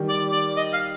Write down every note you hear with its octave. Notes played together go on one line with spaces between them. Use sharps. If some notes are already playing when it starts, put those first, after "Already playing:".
Already playing: D#3 G3
D5
D5
D#5
F5